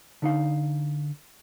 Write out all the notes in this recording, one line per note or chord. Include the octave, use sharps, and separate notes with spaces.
D3 D#4 F5